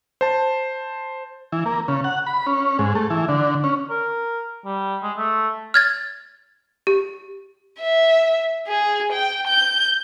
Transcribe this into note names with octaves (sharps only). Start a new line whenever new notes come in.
C5 A5
E3
A#3
C#3
F#5
B5
C#4
G#2
A3
E3
D3
C#4
A#4
G3
G#3
A3
F6 G#6 A6
G4
E5
G#4
G5
G6